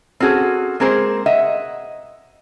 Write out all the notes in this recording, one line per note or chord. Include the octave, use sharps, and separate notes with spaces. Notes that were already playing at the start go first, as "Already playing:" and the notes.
C4 C#4 F#4 G#4 A4
G#3 A#3 C4 G#4 A#4 C5
D#5 E5 F#5